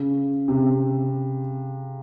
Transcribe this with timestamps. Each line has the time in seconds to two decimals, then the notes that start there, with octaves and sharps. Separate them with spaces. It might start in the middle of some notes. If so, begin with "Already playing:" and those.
Already playing: C#3
0.48 C3